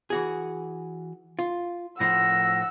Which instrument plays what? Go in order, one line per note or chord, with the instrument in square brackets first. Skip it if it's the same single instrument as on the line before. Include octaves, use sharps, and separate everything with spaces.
[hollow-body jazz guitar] E3 F#4 G#4
F4
[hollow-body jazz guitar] A2 F3 [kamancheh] F#5 E6 [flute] A#6